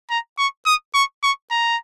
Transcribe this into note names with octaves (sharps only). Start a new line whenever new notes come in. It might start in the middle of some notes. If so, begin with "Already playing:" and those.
A#5
C#6
D#6
C#6
C#6
A#5